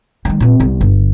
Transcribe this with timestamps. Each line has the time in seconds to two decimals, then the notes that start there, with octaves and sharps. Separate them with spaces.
0.25 D#3 G#3
0.40 A#2 C4
0.60 C2 B3
0.81 G1